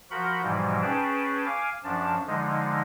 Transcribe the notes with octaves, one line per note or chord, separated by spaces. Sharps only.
F3 F#4 A#4 F#5 B5 G6
G#2 B2 E3 F3 G3
C#4 G#4 B4 G5 A5
F5 G#5 D6
F#2 F3 D4 A5
D3 F3 G#3 D#4